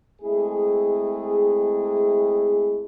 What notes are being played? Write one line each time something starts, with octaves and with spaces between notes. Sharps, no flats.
G#3 A3 C4 E4 G#4